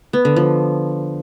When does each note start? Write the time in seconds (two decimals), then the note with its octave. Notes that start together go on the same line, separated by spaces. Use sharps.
0.13 B3
0.25 D3
0.36 F3